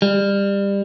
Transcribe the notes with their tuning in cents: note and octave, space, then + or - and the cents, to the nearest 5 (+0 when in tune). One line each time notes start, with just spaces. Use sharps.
G3 +25